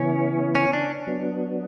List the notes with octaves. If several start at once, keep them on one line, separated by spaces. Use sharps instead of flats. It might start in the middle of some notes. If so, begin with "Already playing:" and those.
Already playing: C#3 E3 B3 C#4 E4
C#4
D4
F#3 B3 D4